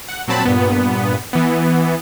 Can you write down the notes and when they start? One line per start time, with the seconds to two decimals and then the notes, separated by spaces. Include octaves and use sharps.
0.08 F#5
0.28 A#2 F#3 C4 A5 B5
0.45 G2 A#2 B3
1.33 E3 B3